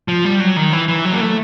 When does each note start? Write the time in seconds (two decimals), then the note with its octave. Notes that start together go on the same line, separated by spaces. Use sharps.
0.08 F3
0.25 G3
0.40 F#3
0.56 D#3
0.73 E3
0.88 E3
1.05 F#3
1.12 A#3
1.21 A3